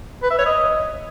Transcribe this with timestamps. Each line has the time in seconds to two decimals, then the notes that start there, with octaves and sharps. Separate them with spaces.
0.23 B4
0.31 E5
0.38 C#5
0.46 D#5